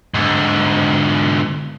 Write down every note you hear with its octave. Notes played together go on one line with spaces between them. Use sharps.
G#2 D3